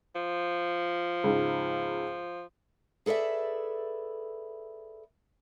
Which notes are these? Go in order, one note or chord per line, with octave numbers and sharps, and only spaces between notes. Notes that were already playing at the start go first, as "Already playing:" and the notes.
F3
C#2 G#2
G#4 A4 B4 D5 E5